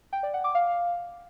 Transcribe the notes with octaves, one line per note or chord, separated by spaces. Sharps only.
G5
D5
F#5
D6
F5